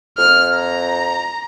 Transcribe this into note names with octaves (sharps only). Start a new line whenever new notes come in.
F2 F6
A#5